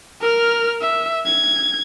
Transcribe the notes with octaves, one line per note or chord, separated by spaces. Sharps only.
A#4 F6
E5
G#6